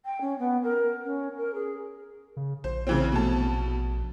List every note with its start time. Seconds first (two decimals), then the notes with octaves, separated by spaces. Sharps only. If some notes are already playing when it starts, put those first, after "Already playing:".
0.04 G5
0.20 C#4
0.38 B3
0.63 A#4
1.03 C#4
1.36 A#4
1.53 G#4
2.37 C#3
2.64 A#1 C5
2.87 C#3 E3 C4
3.12 B2 A3 A5